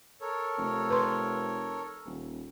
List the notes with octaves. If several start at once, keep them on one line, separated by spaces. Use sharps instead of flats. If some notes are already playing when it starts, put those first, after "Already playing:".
A4 A#4 C#5
F1
B4 C6
D#1